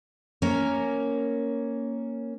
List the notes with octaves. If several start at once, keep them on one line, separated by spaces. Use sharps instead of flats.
A#3 C#4